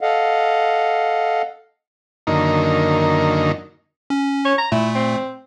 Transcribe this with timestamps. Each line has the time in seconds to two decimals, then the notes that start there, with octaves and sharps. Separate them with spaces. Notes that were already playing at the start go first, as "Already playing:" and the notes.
0.01 A4 D#5 F5 F#5
2.27 F#2 D3 D#3 A#3 D#4
4.10 C#4
4.45 C#5
4.58 A#5
4.72 A#2 A3 E4
4.95 C4